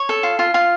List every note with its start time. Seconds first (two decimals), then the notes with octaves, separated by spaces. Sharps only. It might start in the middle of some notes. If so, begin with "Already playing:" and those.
Already playing: C#5
0.09 A4
0.23 F4
0.39 F4
0.54 F4